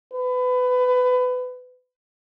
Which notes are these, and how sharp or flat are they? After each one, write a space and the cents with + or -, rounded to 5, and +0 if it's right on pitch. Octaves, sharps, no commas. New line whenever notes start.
B4 +25